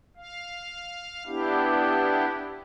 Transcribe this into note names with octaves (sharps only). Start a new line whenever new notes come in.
F5
B3 D4 E4 G4